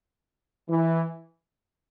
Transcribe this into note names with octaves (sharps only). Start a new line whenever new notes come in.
E3